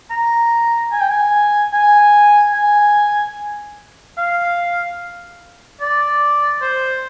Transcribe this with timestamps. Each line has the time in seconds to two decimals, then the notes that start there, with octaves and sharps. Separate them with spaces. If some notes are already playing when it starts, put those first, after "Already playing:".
0.10 A#5
0.92 G#5
1.01 G5
1.09 G#5
1.74 G#5
2.54 G#5
4.18 F5
5.81 D5
6.62 C5